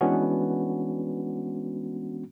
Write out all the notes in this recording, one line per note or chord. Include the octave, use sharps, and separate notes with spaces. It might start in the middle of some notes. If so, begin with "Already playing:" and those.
E3 G#3 B3 C#4 D4 F#4